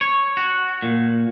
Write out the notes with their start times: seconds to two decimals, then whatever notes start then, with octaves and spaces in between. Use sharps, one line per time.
0.01 C#5
0.37 F#4
0.82 A#2